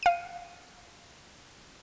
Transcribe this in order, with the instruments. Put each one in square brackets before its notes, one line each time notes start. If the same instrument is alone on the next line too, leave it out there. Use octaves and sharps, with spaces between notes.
[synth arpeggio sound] F5 D#7